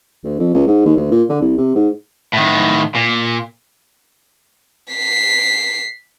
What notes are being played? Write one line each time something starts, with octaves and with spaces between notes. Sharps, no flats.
D2
F2
C#2
G#2
D#2
D2
A#2
D3
C2
C3
G#2
A2 D#3
A#2
B6 C7